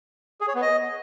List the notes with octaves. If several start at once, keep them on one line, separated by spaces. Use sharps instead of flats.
G#4
C#5
B3
D#5